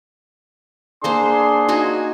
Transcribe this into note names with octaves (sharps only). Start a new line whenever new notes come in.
A#3 D4 G#4 C5 C6
D#4 F#4 G#5